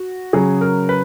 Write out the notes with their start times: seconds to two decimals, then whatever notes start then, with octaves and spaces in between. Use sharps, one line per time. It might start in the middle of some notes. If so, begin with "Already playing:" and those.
Already playing: F#4
0.33 C#3 F#3 G#4
0.61 A#4
0.89 B4